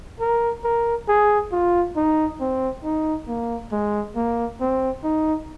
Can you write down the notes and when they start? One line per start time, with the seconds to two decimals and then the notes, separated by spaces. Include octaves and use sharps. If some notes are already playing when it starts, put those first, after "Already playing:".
0.20 A#4
0.64 A#4
1.08 G#4
1.52 F4
1.96 D#4
2.40 C4
2.84 D#4
3.28 A#3
3.72 G#3
4.16 A#3
4.60 C4
5.04 D#4